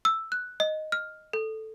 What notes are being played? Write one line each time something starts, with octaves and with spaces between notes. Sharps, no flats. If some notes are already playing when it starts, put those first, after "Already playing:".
E6
F#6
D#5
F6
A4